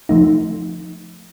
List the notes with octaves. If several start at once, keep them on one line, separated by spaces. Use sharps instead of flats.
F3 A3 D#4